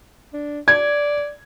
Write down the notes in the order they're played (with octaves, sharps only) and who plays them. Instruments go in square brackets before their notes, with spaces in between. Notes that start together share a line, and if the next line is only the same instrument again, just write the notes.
[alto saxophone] D4
[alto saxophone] D5 [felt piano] G#6